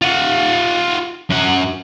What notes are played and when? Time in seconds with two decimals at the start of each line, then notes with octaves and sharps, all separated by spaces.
0.02 F4 F#5
1.30 F#2 F#5